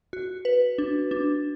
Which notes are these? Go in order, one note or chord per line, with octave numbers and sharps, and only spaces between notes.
F#4
B4
D4
D4